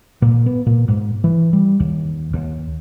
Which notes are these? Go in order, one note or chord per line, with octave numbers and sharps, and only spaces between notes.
A#2
B3
A#2
G#2
E3
G3
D#2
D#2